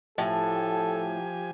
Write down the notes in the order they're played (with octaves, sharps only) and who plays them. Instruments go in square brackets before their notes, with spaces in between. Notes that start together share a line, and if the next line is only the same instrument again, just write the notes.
[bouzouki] A2 [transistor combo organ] F3 G4 G#5 [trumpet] A4